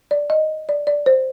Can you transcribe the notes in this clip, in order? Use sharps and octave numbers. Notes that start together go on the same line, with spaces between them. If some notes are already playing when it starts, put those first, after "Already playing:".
D5
D#5
D5
D5
C5